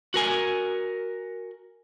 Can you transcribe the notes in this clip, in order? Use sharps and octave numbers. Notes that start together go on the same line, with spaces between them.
F#4 A#4 G#5